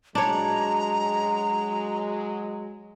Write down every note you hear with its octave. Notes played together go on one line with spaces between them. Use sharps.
F#3 G#3 D4 C#5 A#5